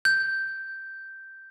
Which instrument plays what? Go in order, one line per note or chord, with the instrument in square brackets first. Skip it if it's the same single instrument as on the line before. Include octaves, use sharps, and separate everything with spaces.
[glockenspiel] G6